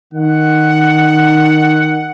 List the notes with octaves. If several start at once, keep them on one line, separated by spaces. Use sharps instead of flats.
D#3 F#5